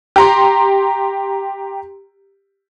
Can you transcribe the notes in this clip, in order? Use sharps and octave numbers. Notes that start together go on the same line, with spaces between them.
G4 A#5 C6